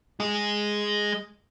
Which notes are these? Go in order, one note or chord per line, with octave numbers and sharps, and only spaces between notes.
G#3 G#4